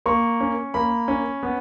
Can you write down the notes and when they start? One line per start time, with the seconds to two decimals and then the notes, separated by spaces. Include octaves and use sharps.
0.06 A#3 C#6
0.40 C#4
0.74 A#3 B5
1.08 C#4
1.43 B3